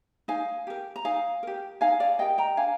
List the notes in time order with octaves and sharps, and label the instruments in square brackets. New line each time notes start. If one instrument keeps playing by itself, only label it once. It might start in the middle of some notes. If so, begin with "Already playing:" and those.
[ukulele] D#4 F5 G#5
G4 A#4
A#5
D#4 F5 G#5
G4 A#4
D#4 F5 G#5
D5 F5
G4 A#4 D#5 G5
G5 A#5
D4 F5 G#5